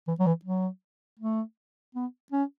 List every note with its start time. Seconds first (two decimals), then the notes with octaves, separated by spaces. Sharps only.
0.08 E3
0.19 F#3
0.27 E3
0.45 F#3
1.19 A3
1.95 B3
2.32 C#4